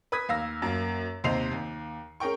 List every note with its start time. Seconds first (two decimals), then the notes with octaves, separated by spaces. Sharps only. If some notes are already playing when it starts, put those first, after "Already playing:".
0.12 B4 B5 D#6 G#6 B6
0.29 D#2 F5 E6 A#6
0.62 F#2 A#3
1.24 D#2 C3 C5 D#5 C7 F7
1.52 D#2
2.20 C#4 G#4 A#4 G5 C#6